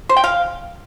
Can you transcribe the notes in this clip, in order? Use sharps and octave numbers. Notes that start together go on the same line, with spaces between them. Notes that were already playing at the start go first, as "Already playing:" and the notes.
C5
G5
F5